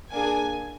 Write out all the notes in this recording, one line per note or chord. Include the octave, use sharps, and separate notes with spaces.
A#3 D4 G#4 G#5